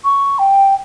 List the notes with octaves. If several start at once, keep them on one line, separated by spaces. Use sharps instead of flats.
C#6
G5